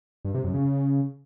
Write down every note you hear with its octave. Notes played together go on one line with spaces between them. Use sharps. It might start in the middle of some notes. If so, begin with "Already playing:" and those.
G2
C3
F#2
C#3